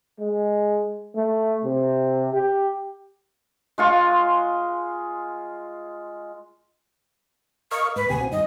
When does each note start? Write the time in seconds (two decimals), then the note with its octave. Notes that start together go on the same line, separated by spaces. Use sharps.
0.20 G#3
1.15 A3
1.64 C3
2.33 G4
3.78 G#3 F4 C#6
7.71 A#4 D#5 F5 C#6
7.96 G#2 B4
8.09 D2 B2 G4 G#5
8.21 C4 F#4
8.32 G2 D#3 D#5